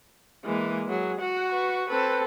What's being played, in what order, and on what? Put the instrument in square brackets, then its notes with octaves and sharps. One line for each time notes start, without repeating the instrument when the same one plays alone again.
[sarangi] E3 [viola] G#3 A#3
[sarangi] F#3 [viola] G#4
[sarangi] F#4 [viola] F#5
[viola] B4 C#6
[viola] C4 A4 [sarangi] B4